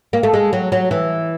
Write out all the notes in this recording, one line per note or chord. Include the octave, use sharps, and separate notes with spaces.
A#3
A3
G#3
F#3
F#3
E3